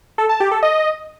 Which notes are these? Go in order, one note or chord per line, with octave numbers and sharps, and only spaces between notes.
A4
A5
G4
A4
D#5